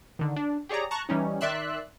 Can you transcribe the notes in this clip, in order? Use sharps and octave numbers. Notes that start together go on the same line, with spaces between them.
D3 D#3
D4
G4 G#4 C#5 D5 A#5
A5 A#5 C#6 F#6
E3 G3 C#4 D#4
D#3 D5 E5 C6 E6 F#6